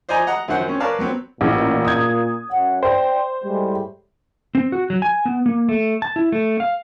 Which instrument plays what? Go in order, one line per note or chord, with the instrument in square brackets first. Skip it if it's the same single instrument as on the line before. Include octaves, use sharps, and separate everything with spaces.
[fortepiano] C5 D5 D#5 G#5 A#5
D#5 F#5 A#5
F#2 D#3 F#4 C5 F#5
C4 C#4
A#4 B4 C#5 D5 F5 A5
F#3 B3 C4
[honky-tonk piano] A1 [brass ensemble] A#2
[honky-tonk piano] D#6 G#6
[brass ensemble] F#2 C#5 F#5
[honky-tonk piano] C5 [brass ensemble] D5 G5
[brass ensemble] A2 G3 G#3
[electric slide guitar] C4
F#4
F#3
G#5
B3
A#3
A3
A5
E4
A3
F5